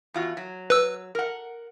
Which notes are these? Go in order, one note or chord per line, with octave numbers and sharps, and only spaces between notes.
E2 F4 F#4
F#3
B4 E6
A#4 F#5